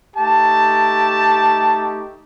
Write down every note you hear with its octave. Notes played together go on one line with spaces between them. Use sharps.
A3 D#4 G4 A5